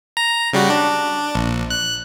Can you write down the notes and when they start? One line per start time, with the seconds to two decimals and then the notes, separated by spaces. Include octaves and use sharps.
0.17 A#5
0.53 C#3 G3 F#4
0.70 D4
1.35 A#1
1.70 F#6